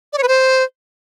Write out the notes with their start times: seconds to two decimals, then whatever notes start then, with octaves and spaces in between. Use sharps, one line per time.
0.13 D5
0.18 C#5
0.23 B4
0.28 C5